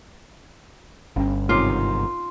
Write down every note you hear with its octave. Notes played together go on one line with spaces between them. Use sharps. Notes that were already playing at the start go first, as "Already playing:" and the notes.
G1 C#4 G5
G#2 C3 D#3 D#4 F4 C#5 D6